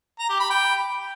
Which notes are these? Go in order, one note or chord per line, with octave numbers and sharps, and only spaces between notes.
A#5
G4
B5
G5